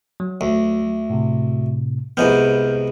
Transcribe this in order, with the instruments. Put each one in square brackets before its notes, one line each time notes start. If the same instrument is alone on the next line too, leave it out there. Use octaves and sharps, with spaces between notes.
[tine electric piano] F#3
[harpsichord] D2
[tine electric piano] A2 C3
[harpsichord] C2 G#2 B3 [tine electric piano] F6 G6